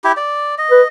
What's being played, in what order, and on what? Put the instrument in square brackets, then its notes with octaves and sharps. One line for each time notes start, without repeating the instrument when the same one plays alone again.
[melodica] E4 G4
D5
D#5
[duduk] B4